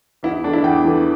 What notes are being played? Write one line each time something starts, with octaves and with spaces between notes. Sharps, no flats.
E2 E4
E3 A3 D4
E4
E2 G5
E3 A3